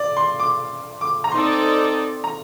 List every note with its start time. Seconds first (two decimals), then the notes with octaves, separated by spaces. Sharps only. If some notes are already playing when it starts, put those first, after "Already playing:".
Already playing: D5
0.17 C6
0.40 D6
1.01 D6
1.24 A#5
1.32 C4 D#4 A4 D5 C6
2.24 A#5